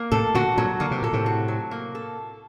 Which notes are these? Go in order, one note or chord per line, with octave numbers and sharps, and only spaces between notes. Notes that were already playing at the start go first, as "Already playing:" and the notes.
Already playing: A#3
A2 C3 A4
A#2 D3 F#4
G2 A#2 F#3
D3 A#3
C3
A#2 A4
A2 C3
F#4
F#3
A#3
A4